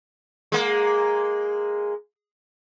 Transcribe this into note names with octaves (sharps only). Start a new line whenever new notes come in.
G#3 A#3